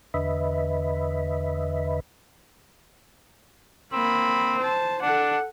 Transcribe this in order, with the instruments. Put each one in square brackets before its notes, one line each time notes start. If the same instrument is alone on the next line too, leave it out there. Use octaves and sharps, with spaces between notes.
[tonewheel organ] E2 D3 B4 D#5 E5 B5
[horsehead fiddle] A#3 B5 [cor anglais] C4
[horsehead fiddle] C5 A5
[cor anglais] D4 [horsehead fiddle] A4 F#5